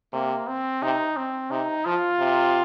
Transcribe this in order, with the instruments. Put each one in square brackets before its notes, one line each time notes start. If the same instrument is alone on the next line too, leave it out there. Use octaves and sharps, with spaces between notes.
[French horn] C3 [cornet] A#3
[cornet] C4
[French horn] C3 [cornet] D#4
[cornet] C4
[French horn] C3 [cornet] D#4
[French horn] F3 [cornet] F4
[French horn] C3